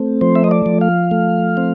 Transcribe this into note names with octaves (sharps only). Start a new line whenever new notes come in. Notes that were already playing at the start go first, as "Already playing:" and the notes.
Already playing: A3 C4
F3 C5
E5
D#5
D5
F3
F5
A3
C4